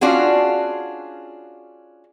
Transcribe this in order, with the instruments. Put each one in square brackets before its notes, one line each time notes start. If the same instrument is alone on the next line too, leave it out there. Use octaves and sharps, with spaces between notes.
[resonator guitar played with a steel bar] C#4 D4 F4 F#4 G#4